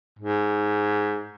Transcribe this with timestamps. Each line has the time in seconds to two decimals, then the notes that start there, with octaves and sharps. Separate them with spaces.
0.19 G#2